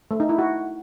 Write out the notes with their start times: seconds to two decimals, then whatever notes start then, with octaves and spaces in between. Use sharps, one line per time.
0.11 A3
0.20 D#4
0.29 E4
0.38 F#4